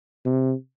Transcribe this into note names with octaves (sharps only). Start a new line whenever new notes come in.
C3